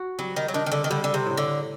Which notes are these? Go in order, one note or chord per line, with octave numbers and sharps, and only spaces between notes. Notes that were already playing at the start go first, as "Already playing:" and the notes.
Already playing: F#4
F#3 G3
D#3
F#3
D#3 D4
D#3
D3
D#3
D3 G3
D3
C3
A2
D3